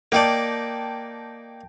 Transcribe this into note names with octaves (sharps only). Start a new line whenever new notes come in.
A#3 D#4 D5 G5 A5